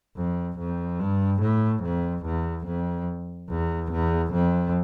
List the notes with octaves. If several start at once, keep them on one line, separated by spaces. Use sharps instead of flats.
F2
F2
G2
A2
F2
E2
F2
E2
E2
F2